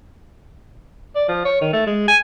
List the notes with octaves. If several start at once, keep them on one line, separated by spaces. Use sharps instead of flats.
D5
F3
C#5
D#3
A3
G#3
G#5